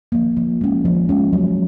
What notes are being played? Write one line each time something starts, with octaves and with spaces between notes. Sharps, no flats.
F3 A#3
F3
G#3 C#4
F3
G#3 C#4
F#3